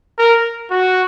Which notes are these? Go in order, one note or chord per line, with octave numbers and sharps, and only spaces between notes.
A#4
F#4